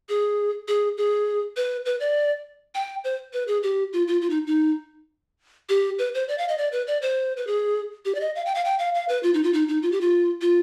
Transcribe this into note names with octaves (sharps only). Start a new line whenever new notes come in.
G#4
G#4
G#4
B4
B4
D5
G5
C5
B4
G#4
G4
F4
F4
F4
D#4
D#4
G4
B4
C5
D5
F5
D#5
D5
B4
D5
C5
B4
G#4
G4
D5
D#5
F5
G5
F5
G5
F5
F5
B4
F4
D#4
F4
D#4
D#4
F4
G4
F4
F4